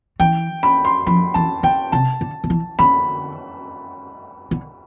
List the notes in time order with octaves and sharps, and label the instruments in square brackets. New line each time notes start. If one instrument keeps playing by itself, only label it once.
[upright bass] E3 [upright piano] G5
[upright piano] B5
C6
[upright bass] F3 [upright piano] B5
[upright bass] E3 [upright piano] A5
[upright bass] D3 [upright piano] G5
[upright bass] C3 [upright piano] A5
[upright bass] D3
D3
E3
[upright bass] D3 [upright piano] B5
[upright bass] D3